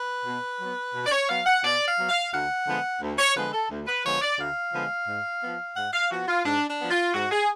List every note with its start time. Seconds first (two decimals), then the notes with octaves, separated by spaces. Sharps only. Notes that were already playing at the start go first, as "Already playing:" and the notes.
Already playing: B4
0.26 B2
0.60 F#3 B3
0.95 B2
1.06 D5
1.12 C#5
1.29 F#3 B3 F5
1.46 F#5
1.63 B2 D5
1.86 F5
1.98 F#3 B3
2.09 F5
2.32 D2 F#5
2.67 D3 F3 G#3 B3
3.01 D2
3.18 C#5
3.35 D3 F3 G#3 B3 B4
3.53 A4
3.70 D2
3.87 B4
4.04 D3 F3 G#3 B3 C#5
4.22 D5
4.38 D2 F5
4.73 D3 F3 G#3 B3
5.07 G#2
5.42 F3 B3
5.76 G#2 F#5
5.93 F5
6.11 F3 B3 F#4
6.28 F4
6.45 G#2 D4
6.68 D4
6.80 F3 B3
6.90 F4
7.14 G#2 F#4
7.31 G#4